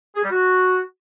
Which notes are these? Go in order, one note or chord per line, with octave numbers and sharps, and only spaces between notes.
G#4
G3
F#4